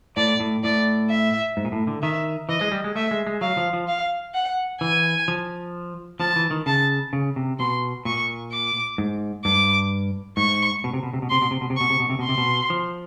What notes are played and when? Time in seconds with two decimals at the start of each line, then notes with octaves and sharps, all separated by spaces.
0.17 A2 D5
0.40 A2
0.64 A2 D5
1.09 E5
1.57 G#2
1.65 A#2
1.72 A2
1.87 D3
2.03 D#3 E5
2.49 E3 D#5
2.61 G#3
2.72 G3
2.84 G#3
2.95 A3 E5
3.11 G#3
3.27 G#3
3.41 F#3 F5
3.57 F3
3.73 F3
3.88 F5
4.35 F#5
4.81 E3 G#5
5.28 F3
6.20 F3 A5
6.36 E3
6.51 D#3
6.66 C#3 A5
7.13 C#3
7.36 C3
7.59 B2 C6
8.05 A#2 C#6
8.52 D6
8.98 G#2
9.45 G2 D6
10.37 G#2 C#6
10.84 B2
10.94 C3
11.03 B2
11.13 C3
11.22 B2
11.30 C3 C6
11.42 B2
11.51 C3
11.61 B2
11.70 C3
11.77 B2 C#6
11.90 C3
12.00 B2
12.10 C3
12.19 B2 C6
12.29 C3
12.38 B2
12.70 F3